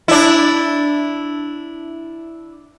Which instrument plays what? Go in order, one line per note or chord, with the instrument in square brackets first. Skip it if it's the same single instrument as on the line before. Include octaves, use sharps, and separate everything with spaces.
[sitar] D4 E4